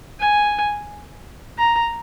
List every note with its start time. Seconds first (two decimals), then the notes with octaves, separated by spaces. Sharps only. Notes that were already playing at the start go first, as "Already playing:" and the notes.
0.20 G#5
1.58 A#5